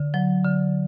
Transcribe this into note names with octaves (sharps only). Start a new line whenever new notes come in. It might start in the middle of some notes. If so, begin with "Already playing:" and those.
Already playing: D3
F#3
D3